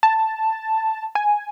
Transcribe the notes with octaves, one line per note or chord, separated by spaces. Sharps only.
A5
G#5